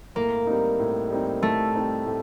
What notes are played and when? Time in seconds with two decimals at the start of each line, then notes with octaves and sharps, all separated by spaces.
0.15 A2 A#3
0.47 G3 C4 D#4
0.80 A2
1.10 G3 C4 D#4
1.42 A2 A3
1.74 G3 C4 D#4
2.06 A2